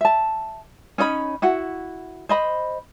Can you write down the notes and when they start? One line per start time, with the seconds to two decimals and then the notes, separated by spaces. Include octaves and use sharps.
0.01 E5 A5
0.98 C#4 D#4 D#5 B5
1.42 E4 F#4 F#5
2.29 C5 D#5 B5